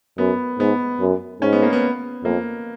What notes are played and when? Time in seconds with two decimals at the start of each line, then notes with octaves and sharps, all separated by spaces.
0.18 F#2 B3
0.59 G#2 B3
1.00 F#2
1.42 G#2 C#4
1.53 B3
1.62 A#3
1.73 B3
2.24 F2 A#3